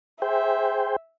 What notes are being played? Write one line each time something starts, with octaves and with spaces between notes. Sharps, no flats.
G#4 C5 E5 G5